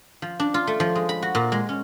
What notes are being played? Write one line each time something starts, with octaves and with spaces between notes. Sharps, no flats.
F3
D4
F4
A3
F3
G#3
B5
F#4
A#2
G#3
C#4